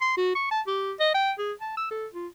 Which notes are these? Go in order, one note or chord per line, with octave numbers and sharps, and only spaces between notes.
C6
F#4
C#6
A5
G4
D#5
G5
G#4
A5
E6
A4
F4